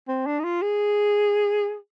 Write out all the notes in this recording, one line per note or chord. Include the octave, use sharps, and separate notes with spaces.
C4
D4
D#4
F4
G#4